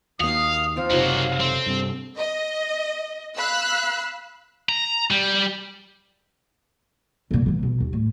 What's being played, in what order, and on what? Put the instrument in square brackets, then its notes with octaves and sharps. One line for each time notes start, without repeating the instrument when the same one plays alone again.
[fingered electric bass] D#2 A#3 [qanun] D#4 F#4 [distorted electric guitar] F5 [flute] D#6
[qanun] F3 C4 F4 [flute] F5
[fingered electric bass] F#1 C3 [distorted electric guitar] A#3 F#4 [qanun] D#4 F4 C#5
[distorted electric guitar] C4 [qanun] A4 E5
[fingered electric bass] G2 C3
[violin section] D#5
F5 B5 E6 F#6
[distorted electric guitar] A#5
G3
[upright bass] A#2 C#3
A2 E3
B2
D#2
A2